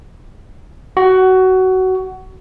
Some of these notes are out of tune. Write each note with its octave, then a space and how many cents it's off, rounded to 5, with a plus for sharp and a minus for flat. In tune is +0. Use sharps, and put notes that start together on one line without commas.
F#4 +20